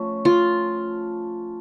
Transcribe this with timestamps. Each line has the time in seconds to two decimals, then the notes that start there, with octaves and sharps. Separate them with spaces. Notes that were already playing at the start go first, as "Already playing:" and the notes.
Already playing: F3 A3 C#4
0.25 F4